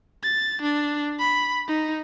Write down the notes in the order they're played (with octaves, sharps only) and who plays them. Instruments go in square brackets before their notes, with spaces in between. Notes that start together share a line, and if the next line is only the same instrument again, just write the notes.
[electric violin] A6
D4
B5
D#4